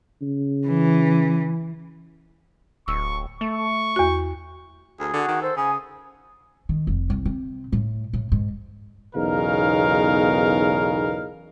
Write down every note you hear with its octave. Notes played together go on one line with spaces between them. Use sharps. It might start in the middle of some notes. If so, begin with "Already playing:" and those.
C#3
E3
D1 C#6 E6
A3 C#6
E2 F#4
D2 G#4
D3 F#4
D#3
A4 C5
C#3 G#5 D#6
D#3
F1
C2
C3
A2
A2
G#2
B1 E2 C#3 D#4 A#4 F5